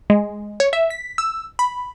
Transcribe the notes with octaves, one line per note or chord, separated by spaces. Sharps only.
G#3
C#5
E5
B6
E6
B5